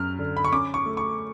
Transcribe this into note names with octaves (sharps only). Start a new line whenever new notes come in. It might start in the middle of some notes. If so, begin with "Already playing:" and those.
Already playing: F#2 F#3 F6
D3
B5
C#6
C#4 D6
C#6
A3
C#6